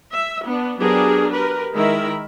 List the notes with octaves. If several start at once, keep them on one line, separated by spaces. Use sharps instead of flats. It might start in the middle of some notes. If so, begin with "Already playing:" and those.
E5
B3 D4
F#3 B3 D4 G4 G#4 A#4
G4 A#4 B4
D#3 G#3 E4 A#4 E5 B5